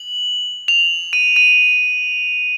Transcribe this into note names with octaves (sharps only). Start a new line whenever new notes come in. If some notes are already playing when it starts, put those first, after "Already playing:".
Already playing: F#7
F7
D#7
D#7